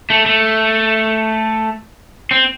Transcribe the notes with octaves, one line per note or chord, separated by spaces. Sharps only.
A3
A3
C4